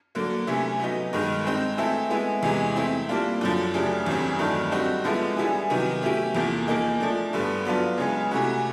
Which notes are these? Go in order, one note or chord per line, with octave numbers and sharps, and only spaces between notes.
D3 F#3 A#3
C3 E3 A3 C#4 E4
F#3 B3 D#4
G2 D#3 G#3
G#3 C4 D#4
E3 A3 C4 E4 A4
G#3 B3 E4 G#4
E2 C3 E3 G#3 B3
A3 C4 E4
G3 A#3 D4 F4
F#2 D3 F3
C#3 E3 A3 D4 G4
E2 C#3 E3 G3 C4
G2 D#3 F#3 A3 D4
G3 C4 D#4 F#4
D3 F3 G#3 B3 E4
E3 G3 B3 E4 G#4
C3 D#3 F#3 B3
A3 C#4 E4 G4
E2 C3 F3 A#3
F3 A#3 D#4 G#4
F3 A3 D4
G2 D3 G3 B3
F#3 B3 D4 F4
C#3 E3 G#3
C3 E3 A3 C#4 F#4